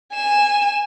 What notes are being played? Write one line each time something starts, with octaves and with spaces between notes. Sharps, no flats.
G#5 E7